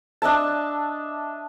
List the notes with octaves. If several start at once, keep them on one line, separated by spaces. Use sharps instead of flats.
D4 D#5 E5 A5